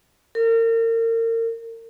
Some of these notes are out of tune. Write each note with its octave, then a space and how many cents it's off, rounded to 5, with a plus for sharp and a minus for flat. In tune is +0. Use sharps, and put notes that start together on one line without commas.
A#4 -35